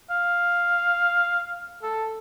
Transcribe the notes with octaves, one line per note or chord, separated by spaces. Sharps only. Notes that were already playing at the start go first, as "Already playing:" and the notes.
F5
A4